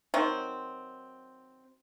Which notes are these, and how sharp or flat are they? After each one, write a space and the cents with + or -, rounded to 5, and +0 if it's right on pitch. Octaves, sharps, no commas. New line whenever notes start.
D#3 +10 F#3 +0 C4 +0